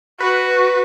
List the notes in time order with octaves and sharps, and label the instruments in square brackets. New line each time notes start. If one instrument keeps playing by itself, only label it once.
[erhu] F#4 [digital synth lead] B4